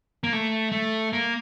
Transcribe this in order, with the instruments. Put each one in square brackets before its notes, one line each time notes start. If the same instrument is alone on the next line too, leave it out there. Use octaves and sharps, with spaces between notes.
[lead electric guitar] A#3
A3
A3
A#3